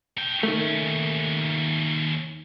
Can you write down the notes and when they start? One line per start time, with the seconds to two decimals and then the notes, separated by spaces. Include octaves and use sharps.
0.17 A3 G5
0.43 D#2 D#3 A3 C#4